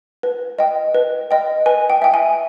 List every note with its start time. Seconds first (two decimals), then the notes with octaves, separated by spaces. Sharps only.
0.23 B4
0.59 D#5 G5
0.95 B4
1.31 D#5 G5
1.66 B4 G#5
1.90 G5
2.02 E5 G5
2.14 G#5